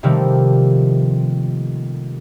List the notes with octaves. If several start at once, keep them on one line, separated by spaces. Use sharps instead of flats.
C3 D#3 F3 G3 A3 A#3